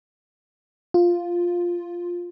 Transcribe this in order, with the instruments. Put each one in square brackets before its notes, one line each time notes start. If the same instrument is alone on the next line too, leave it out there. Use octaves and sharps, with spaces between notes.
[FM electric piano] F4